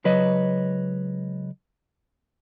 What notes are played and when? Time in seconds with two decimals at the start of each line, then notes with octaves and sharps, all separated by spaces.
0.04 C#2 F#3 B4 C#5 D#5